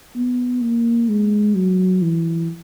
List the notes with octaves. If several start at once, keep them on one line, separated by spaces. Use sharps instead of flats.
B3
A#3
G#3
F#3
E3